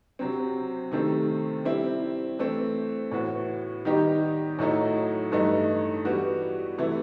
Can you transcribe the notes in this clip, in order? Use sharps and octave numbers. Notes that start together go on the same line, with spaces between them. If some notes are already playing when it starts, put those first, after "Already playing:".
C3 F#3 C4
C3 D#3 A3 C4
G3 C4 E4
E3 A3 C4
A2 E3 B3 F#4
D#3 G3 B3 D#4 G4
A2 F#3 A3 D#4
G2 E3 A3 D#4
E3 G3 B3 F#4
C3 E3 A3 E4